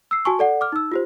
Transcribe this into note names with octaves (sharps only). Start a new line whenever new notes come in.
E6 C7
F#4 G#5 A5 C#6
A4 D5 F#5
D6 F6
D#4 E6
F4 G4 C5